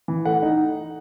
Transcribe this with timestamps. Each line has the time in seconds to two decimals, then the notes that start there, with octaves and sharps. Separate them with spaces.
0.08 E3
0.25 A3 F#5
0.42 D#4